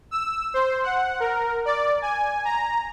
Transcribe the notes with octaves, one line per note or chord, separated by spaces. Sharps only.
E6
C5
F#5
A#4
D5
G#5
A#5